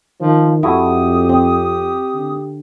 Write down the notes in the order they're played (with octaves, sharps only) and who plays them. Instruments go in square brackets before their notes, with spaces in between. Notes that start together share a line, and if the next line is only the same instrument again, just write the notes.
[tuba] D#3 [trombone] F3
[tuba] F2 [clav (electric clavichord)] E4 F#4 A4 [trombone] G4 [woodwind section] D#6
[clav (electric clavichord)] C4
[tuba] D3